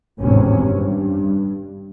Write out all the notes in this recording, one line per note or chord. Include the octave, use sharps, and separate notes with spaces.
G#1 E2 A2 C3 C#4
G2